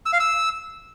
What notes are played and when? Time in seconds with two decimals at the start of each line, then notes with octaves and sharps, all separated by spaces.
0.06 E6
0.13 F5
0.20 E6